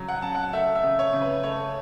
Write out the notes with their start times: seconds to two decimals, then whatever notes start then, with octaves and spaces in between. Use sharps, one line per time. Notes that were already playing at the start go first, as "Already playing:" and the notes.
Already playing: C#3 F#3
0.08 F#5
0.22 C#3 A5
0.35 F#5
0.53 A3 E5
0.75 E5
0.84 C#3
0.99 C#5
1.13 C#3
1.22 B4
1.44 A3 C#5